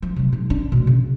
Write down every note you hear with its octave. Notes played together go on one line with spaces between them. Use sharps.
F3
C3 F#3
G#2
D4
D2 B2
C#3